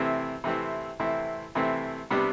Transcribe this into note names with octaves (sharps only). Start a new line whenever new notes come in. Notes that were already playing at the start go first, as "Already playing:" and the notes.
Already playing: C3 E3 A3 C4 E4
C3 E3 A3 C4 E4
C3 E3 A3 C4 E4
C3 E3 A3 C4 E4
C3 G3 B3 D4